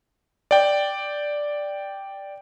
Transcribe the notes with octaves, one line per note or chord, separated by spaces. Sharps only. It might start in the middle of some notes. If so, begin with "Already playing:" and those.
D5 G5